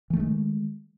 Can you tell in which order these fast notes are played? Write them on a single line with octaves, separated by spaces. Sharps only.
E3 A3 D#3 G#3